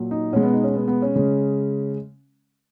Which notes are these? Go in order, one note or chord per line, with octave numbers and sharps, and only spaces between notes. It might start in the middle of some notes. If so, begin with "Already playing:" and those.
Already playing: A#2 F#3
D#4
B2 G#3 C#4
B3
D#4
C#4
B3
B3
C#4
C#3 G#3